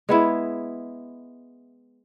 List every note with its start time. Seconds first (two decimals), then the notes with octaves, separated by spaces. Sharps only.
0.09 G#3 B3 E4